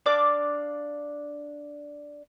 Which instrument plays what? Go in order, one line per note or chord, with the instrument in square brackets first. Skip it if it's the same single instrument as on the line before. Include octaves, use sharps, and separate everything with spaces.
[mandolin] D4 D5 F5 D6